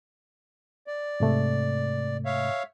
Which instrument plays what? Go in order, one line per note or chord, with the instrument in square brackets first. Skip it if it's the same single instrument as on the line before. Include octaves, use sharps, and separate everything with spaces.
[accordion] D5
[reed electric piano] G#2 C3 A3
[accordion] C#5 E5 F5